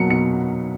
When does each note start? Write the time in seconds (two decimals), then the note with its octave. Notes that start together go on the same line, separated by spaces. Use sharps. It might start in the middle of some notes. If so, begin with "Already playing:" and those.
Already playing: B2 F#3 A#3 C#7
0.10 B2 C#7